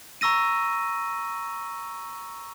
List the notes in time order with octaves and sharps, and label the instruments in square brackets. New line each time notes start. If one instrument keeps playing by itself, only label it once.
[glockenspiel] A#5 C#6 E6 A#6 D#7